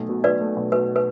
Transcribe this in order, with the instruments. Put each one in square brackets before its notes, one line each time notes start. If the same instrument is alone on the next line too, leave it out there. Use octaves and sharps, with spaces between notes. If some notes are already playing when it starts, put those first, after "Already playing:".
Already playing: [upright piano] B1 A3
B2
[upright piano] B1 [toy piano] B4 D5
[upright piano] A3
B1
[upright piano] B2 [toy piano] B4
[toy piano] B4